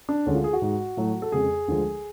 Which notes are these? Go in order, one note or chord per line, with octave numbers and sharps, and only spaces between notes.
D4
D2 D3 G#3 C#4
F4
G#4
F#4
G#2 G#3
A2 F#3 A3
A4
F2 C#3 G#3 G#4
D2 D3 F3 G#3